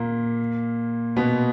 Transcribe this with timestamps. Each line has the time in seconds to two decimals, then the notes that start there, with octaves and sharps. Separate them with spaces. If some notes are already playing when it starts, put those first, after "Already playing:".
Already playing: A#2 A#3
1.16 B2 B3